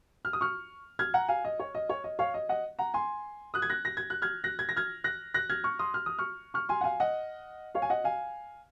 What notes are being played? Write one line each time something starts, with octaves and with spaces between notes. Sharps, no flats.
F6
D#6
C#6 F6
F6 G#6
F#5 A#5
F5 G#5
D#5
C#5
D#5
C#5
D#5
C#5 F5
D#5
D#5 F#5
F#5 A#5
G#5 C6
D#6 F#6
G#6
F#6 A#6
A#6
G#6
F#6
F6 G#6
F#6 A#6
G#6
A#6
F6 G#6
F#6 A#6
F#6 A#6
F6 G#6
C#6 F6
C6 D#6
F6
D#6
C#6 F6
C#6 F6
G#5 C6
F#5
F5 G#5
D#5 F#5
C#5 F5
G#5
D#5 F#5
F5 G#5